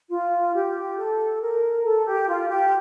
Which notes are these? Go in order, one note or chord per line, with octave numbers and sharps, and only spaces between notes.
F4
G4
A4
A#4
A4
G4
F4
G4